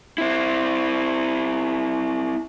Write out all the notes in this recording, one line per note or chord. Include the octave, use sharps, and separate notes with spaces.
C4 E4